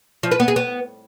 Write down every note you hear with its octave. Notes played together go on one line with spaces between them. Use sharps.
F3
B4
B3
G#4
B3